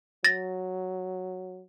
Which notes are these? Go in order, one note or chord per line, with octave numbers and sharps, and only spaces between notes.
F#3 A6 A#6